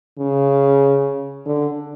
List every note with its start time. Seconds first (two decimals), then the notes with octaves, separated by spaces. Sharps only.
0.18 C#3
1.45 D3